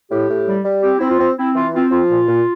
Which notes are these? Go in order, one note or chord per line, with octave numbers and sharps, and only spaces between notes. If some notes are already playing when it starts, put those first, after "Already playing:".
A2 G4
A2
G3
G3
C4 G4
C4 E4
F4
C4
C4 E4
E3 F4
C4 F4
F3 F4
A#2
A#2